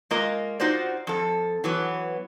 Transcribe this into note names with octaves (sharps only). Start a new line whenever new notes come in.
G#3 A#3 F4 A#4 D#5
D#4 F4 F#4 C5 D5
F2 A4
E3 F#3 B3